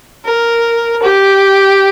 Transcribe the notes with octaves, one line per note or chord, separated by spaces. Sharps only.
A#4
G4